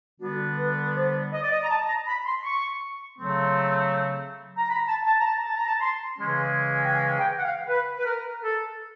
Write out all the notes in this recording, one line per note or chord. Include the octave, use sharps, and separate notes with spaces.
D3 G3 B3 D4 F#4
B4
C5
D#5
D5
D#5
A#5
A5
A#5
B5
C6
C#6
C#3 F#3 A3 C4 C6
A#5
B5
A5
A5
A#5
A5
A5
A#5
A5
C6
C#3 E3 G#3 C#4 C6
G5
G#5
G5
F#5
F5
B4
B4
A#4
A4